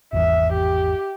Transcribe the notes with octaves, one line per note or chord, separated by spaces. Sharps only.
G#1 E2 E5
G4